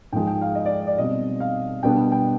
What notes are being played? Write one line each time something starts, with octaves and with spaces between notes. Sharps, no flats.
G#2 F3 G#3 G5
G5
F5
D#5
D5
D5
B2 G3 C4 D#5
F5
B2 G3 B3 D4 G5
G5